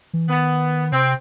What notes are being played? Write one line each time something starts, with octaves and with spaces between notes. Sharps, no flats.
E3
D#3 B3
C3 C4